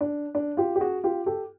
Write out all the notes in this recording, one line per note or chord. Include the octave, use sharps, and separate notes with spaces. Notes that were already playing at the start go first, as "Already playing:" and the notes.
D4
D4
F4 G4
G4
F#4 G#4
F4 G4
G4 A4